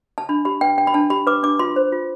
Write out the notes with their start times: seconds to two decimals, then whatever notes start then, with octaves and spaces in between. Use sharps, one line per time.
0.18 A5
0.29 D4 B5
0.45 G4 B5
0.61 B4 G5
0.78 D4 G5
0.87 B5
0.94 D4 A5
1.10 G4 B5
1.27 B4 D6
1.43 D4 D6
1.59 F4 C6
1.76 C5
1.92 F4